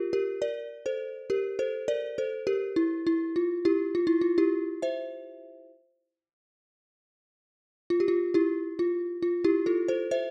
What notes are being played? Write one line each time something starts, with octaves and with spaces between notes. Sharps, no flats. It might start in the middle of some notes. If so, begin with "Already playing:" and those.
Already playing: F4 G4 A#4
G4 A#4
A#4 D5
A4 C5
G4 A#4
A4 C5
A#4 D5
A4 C5
G4 A#4
E4
E4
F4
E4 G4
F4
E4
F4
E4 G4
C5 E5
F4
G4
F4
E4 G4
F4
F4
E4 G4
F4 A4
A4 C5
C5 E5